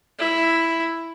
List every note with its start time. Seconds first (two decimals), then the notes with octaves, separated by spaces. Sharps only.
0.19 E4